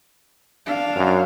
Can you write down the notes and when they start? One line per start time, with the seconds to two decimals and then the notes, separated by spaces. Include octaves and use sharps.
0.66 D4 F5
0.96 F#2